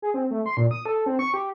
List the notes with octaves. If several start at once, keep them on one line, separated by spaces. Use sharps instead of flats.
G#4
C4
A3
C6
A#2
D#6
A4
C4
C#6
G4